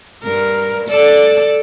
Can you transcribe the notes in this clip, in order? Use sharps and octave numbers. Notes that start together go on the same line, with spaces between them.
G2 A#4
A4 D5